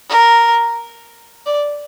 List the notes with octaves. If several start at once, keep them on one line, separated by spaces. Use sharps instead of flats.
A#4
D5